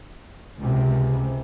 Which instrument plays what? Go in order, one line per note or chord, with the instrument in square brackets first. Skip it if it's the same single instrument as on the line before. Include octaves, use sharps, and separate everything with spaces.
[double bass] C#2 C3